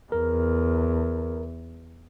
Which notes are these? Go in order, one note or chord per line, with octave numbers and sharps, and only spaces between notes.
E2 A#4